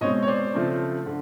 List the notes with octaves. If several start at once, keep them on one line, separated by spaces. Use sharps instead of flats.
B2 G#3 C4 C#5 D#5
C#5
C5 D5
C#3 F3 A3 C4
D3